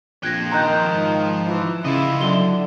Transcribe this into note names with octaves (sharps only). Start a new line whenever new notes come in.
A#1 F3 G5 F#6 G#6 A#6
D#3 A#5 F#6 G6
G#2
E3
C#3 E4 F4 D#5
D3 F#3 F#4 E5 G7